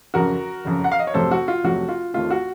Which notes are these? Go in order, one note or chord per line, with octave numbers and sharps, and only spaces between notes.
F#1 F2 C#3 F#4 A#4
F#1 F2 C#3
F#5
F5
D#5
C#5
F1 F2 C3 F#3 A3 A4 C5
F#4
F4
F1 F2 C3 F#3 A3 F#4
F4
D#2 D#3 A3 C4 F4
F#4